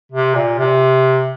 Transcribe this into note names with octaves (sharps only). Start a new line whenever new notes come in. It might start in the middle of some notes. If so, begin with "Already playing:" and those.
C3
A#2
C3